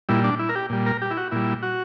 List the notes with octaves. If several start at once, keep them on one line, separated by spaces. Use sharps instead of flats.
A#2 G3 E4
D4
E4
A#4
G4
A#2 G3
A#4
G4
E4
F#4
A#2 G3 E4
F#4